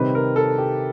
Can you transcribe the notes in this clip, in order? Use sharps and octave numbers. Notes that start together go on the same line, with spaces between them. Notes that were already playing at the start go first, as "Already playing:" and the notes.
Already playing: C3 D#3 G3 C4 B4
A#4
A4
G4